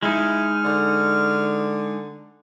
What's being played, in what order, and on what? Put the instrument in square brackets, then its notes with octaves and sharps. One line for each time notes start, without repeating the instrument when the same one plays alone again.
[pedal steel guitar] G#3 D#4 [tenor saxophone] E4 [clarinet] F6
[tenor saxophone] D3